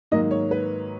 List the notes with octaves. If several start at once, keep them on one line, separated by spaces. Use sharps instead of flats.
G#2 D#3 F#3 A#3 D#5
C#5
B4